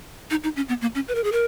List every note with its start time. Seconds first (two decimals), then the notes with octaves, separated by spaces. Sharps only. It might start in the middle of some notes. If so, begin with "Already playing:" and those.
0.30 D#4
0.44 D#4
0.56 C#4
0.69 B3
0.81 A#3
0.95 C#4
1.08 B4
1.15 A#4
1.24 G#4
1.32 A#4